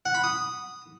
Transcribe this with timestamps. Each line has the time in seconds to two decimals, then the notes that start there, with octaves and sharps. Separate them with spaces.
0.06 F#5
0.15 B5
0.24 D#6